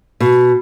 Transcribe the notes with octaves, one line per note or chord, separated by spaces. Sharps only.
B2